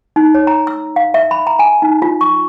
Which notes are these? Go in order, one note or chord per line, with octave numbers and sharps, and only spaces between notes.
D#4
C#5
A#5
E6
F5
E5
B5
A#5
G#5
D#4
F4
C#6